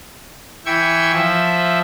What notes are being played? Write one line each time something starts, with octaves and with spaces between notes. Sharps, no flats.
E3 E5 G5 C#6 G#6
F3 E5